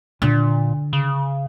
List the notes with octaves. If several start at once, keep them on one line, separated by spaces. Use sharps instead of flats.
A#2 D3
C#3